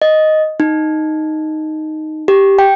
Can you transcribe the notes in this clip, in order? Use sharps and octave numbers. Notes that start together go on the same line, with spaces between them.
D#5
D#4
G4
G5